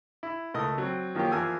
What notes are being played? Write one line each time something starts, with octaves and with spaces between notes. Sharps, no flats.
E4
C#2 A3 A#4 D#5 D#6
F#3 C4
D#3 F3 A#3 C#4 G4
E2 F3 A#4 G#5 E6